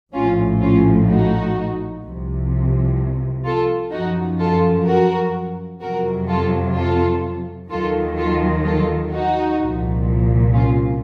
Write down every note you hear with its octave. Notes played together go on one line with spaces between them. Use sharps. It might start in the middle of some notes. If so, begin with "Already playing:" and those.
A#1 A2 F3 C#4 F4
C#4 F4
D#4 F#4
C2 C3 F3
F4 A4
F#2 F3 D#4 F#4
F4 A4
F#4 A#4
F2 C3 F#3 F#4 A#4
F4 A4
F4 A4
D#2 D#3 F#3 F4 A4
F4 A4
F4 A4
D#4 F#4
C2 A#2 F3
C#4 F4